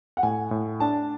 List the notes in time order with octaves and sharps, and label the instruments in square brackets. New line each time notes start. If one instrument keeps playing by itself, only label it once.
[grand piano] F#5
[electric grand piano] A2 [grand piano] G#5
[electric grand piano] A2
[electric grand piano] D4 [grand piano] A5